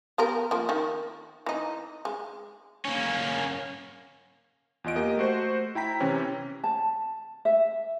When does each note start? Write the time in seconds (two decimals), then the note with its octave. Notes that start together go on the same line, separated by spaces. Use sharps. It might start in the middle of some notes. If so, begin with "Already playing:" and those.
0.18 B3 G4 A#4
0.51 F3 A#3
0.69 D#3
1.46 E3 D#4
2.05 G#3
2.85 A#3 C#4
4.84 E2 F4 D#5 D7
4.96 A#3 G4 A#4 D#5
5.17 A3 F#4 C5
5.75 E4 G5 A#5 B6
6.00 C3 E3 C4 C#4
6.64 A5
7.45 E5